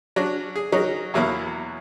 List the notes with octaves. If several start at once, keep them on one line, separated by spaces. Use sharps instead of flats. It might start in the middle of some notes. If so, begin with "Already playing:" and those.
F#3 C#4 D4
G#4
F#3 C#4 D#4 A#4
E2 B2 F#3 A#3 E4